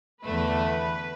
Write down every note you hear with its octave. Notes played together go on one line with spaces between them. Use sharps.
E2 D3 A3 B4